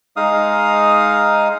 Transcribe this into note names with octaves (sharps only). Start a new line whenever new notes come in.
G#3 D#4 F5 D#6